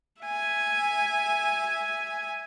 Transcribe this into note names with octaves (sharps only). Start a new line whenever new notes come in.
E5 G#5